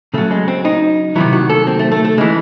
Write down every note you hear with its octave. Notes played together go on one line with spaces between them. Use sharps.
C#3 F#3 A3
G#3
C4
D#4
C3 D#3 F#3 E4
F#4
A4
C4
A3
A3
A3
C#3 E3 G#3